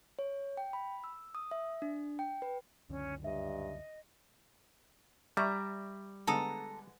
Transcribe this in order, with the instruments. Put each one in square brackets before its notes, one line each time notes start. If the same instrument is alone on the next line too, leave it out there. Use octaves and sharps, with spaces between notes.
[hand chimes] C#5
G5
B5
E6
D#6
E5
D4
G5
B4
[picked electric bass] C#2 F#2 D3 [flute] C#4
[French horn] G2 [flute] D#5 [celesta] E5
[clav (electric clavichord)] G3 [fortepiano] D5 E5 C#6 [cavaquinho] A#5
[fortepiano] D3 G#3 B3 [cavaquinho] A4 A#5 D#6